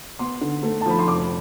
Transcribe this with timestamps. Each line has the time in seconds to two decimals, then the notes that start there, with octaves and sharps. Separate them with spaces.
0.19 B3 C6
0.41 D3
0.63 A3
0.81 A5
0.86 F3 B5
0.99 C6
1.08 F1 D6